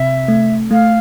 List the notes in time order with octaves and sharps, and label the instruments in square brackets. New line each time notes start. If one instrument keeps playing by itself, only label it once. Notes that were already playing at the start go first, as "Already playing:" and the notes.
Already playing: [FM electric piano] C3 C4 [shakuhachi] E5
[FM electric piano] A3
[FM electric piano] A3 [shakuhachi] F5